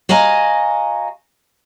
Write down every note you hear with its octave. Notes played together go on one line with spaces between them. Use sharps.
F#4 D#5 F5 G#5 A#5